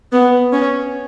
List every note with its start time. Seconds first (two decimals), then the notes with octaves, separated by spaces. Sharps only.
0.12 B3
0.53 C#4